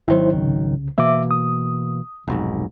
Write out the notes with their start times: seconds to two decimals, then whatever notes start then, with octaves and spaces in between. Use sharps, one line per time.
0.08 G#1 D#3 F#3 E4 C5
0.33 C2 C#3
0.98 B2 E3 A#3 E5 D6
1.31 D#6
2.28 F1 B1 G#2